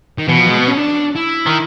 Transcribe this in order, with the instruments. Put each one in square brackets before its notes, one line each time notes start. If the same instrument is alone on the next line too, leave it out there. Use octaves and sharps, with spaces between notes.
[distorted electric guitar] D#3
[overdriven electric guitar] B2 [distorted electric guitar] E3
[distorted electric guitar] F3
G#3
B3
C#4
D4
E4
[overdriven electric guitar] D#3